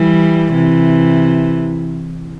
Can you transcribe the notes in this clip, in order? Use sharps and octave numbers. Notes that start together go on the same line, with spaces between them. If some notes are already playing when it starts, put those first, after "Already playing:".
Already playing: E3 G3
C3 E3